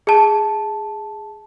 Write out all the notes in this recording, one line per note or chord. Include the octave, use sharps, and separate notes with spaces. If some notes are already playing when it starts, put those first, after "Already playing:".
G#4 A5